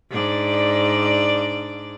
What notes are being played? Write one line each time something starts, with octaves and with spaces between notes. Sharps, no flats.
G#2 D4 D5